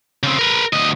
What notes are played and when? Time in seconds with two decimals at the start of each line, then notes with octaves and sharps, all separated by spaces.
0.23 C#3 C4
0.39 A#4 B4
0.73 D2 D#5